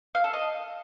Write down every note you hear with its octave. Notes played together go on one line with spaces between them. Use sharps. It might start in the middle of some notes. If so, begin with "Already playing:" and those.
F5
A4
D#5